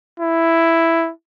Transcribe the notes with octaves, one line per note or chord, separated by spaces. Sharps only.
E4